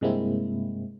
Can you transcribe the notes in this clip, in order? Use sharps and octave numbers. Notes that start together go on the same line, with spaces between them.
G2 C3 G#3 A#3 C4 E4